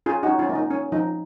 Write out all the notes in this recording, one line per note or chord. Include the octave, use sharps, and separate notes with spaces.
C#4 F4 G#4
C#4 D#4 F#4
C#4 F4
A#3
D#4
C#4
F3 D#4